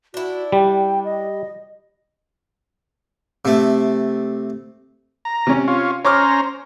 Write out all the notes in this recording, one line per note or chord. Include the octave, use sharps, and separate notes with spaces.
D4 E4 F#4
G3 G5
D#5
C3 A3
A#5
C3 C#4
F4 C#5
C#4 C5 C#5 A#5 D6 F6